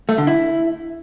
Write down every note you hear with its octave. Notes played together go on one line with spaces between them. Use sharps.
A3
D3
E4